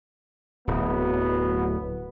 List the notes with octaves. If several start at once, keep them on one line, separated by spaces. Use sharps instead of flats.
D1 F#3 B3